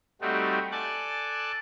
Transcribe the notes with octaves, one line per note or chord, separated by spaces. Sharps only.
G3 A3 C4 D#4 F#4 G4
A4 D5 G#5 A5 F#6 A6